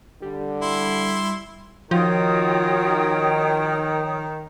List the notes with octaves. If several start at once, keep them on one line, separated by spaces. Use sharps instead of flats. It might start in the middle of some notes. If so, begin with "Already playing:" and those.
D3 G3
E4 C6
D#3 F3 F4 F#4 C#5 G5 D#6